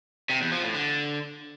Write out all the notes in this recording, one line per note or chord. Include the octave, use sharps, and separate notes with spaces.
C3
E2
F3
A2
D3